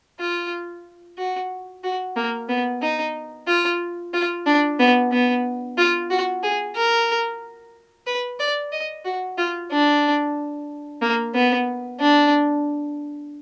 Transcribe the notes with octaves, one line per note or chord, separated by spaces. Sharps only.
F4
F#4
F#4
A#3
B3
D#4
F4
F4
D4
B3
B3
F4
F#4
G#4
A#4
B4
D5
D#5
F#4
F4
D4
A#3
B3
D4